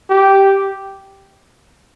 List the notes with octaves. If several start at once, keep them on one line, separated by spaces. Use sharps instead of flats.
G4